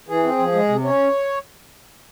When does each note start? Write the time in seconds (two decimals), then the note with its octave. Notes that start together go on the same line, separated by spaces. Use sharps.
0.08 E3 G#4
0.23 C4
0.39 F3
0.53 G#3
0.69 C3
0.84 C#4 C#5